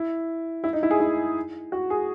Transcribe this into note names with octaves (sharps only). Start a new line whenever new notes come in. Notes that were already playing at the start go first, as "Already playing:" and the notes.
Already playing: E4
E4
D#4
E4
G#4
E4
F#4
G#4